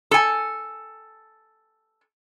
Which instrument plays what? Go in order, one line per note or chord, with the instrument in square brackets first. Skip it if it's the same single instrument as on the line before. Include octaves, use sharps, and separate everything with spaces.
[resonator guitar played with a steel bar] A4 G#5